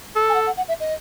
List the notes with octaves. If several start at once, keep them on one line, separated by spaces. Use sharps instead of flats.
A4
G#5
F#5
F#5
F#5
E5
D#5